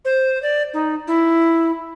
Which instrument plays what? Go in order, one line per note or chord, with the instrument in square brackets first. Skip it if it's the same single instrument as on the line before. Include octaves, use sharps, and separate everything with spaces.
[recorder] C5
D5
D#4
E4